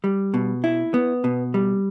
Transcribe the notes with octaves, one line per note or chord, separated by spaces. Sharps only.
G3
B2
E4
B3
B2
G3